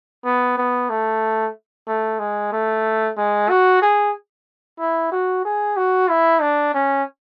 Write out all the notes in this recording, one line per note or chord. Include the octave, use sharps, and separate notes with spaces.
B3
B3
A3
A3
G#3
A3
G#3
F#4
G#4
E4
F#4
G#4
F#4
E4
D4
C#4